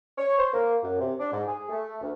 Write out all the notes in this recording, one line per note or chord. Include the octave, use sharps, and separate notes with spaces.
C#5
C5
A#3
F#2
C3
D4
G#2
G#4
A3
D2